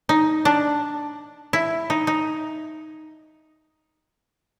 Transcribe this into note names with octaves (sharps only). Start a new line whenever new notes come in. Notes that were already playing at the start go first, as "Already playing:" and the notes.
D#4
D4
E4
D#4
D#4